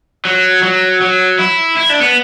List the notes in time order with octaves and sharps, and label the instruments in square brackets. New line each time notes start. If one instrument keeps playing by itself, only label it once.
[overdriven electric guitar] F#3
F#3
F#3
E4
E4
D4
B3